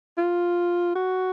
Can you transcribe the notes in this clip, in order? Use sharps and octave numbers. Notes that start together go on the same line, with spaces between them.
F4
F#4